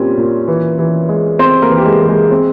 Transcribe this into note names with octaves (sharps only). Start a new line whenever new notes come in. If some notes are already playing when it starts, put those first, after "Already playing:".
Already playing: A#2 G3 C4 C#4
A#2
E3
E3
G#3
C4 C5
A#3 A#4
E3
G4
G#3 G#4
E3
G#3 G#4
C4